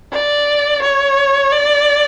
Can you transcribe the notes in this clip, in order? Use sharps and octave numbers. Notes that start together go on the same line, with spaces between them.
D5
C#5
D5